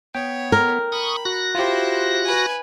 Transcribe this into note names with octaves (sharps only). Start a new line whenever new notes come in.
B3 C#5 G5
A#4
B5 C#6 D#6
F#4 F#6 A#6
E4 F4 G4 C5
B4 G#5